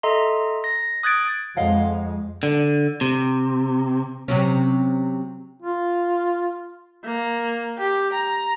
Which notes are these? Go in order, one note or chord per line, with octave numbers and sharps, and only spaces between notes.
A4 D#5 E5 A#5 C6
A#6
D#6 F#6 G#6 A6 D7
F2 G#3 D#5 F5 F#5
D3
C3
C3 F#3 C#4
F4
A#3
G4
A#5